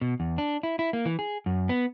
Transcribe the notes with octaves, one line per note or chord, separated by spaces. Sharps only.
B2
E2
D4
E4
E4
A#3
E3
G#4
F#2
B3